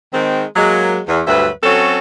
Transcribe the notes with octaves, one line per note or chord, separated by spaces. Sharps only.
D#3 G#3 C4
F#3 G#3 A#3
E2
D2 G2 F#3 B4 C5 E5
F#3 C4 C#4 F#4 A4